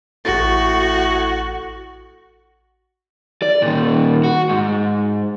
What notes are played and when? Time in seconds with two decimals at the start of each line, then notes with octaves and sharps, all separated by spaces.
0.25 A1 A2 F#4 A6
3.42 D5
3.62 A#2 D#3
4.24 F#4
4.49 G#2